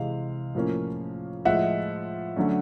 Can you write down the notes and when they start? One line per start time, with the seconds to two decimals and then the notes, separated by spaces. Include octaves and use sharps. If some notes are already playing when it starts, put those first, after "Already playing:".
Already playing: C3 E3 G#3 F5
0.55 A2 F3 A#3 C#4
1.45 A2 F3 G#3 E5 F#5
2.36 D3 F#3 A3 C#4